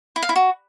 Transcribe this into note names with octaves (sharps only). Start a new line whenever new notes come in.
E4
F5
E4
F#4